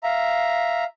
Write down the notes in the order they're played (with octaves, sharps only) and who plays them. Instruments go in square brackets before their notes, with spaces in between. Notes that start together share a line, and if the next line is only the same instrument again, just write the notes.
[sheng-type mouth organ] E5 A#5 [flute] F5